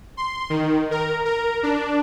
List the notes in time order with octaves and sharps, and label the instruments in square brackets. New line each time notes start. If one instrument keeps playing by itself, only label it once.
[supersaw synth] C6
D#3
A#4
A#4
D4